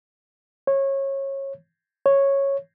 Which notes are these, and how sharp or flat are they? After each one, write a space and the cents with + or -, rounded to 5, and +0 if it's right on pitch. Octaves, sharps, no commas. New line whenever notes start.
C#5 -25
C#5 -10